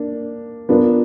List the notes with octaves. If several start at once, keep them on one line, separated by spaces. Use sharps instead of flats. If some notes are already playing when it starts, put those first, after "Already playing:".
Already playing: A#3 D4
B3 D4 F4 A#4